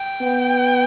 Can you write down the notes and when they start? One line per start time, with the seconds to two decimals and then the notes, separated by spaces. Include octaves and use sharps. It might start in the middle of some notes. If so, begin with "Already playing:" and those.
Already playing: G5
0.22 B3